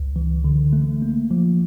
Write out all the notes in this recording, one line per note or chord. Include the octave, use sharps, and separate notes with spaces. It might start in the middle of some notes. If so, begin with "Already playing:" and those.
Already playing: C#2
E3
D3
A3
A#3
F3